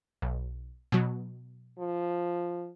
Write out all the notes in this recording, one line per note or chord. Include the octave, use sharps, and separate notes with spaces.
B1
B2 F#3
F3